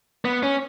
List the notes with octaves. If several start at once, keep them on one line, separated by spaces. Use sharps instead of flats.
B3
C#4